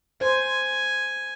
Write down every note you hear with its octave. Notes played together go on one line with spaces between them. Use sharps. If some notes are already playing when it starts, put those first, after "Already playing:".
C5 G#5